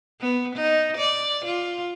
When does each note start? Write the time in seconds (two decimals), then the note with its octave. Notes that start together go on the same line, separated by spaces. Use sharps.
0.21 B3
0.56 D#4
0.97 D5
1.45 F4